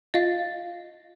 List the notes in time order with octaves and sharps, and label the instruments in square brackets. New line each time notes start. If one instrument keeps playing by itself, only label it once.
[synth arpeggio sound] F4 A6 [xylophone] D#5 F5